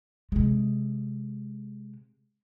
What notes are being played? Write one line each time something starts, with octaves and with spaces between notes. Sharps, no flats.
C3 G#3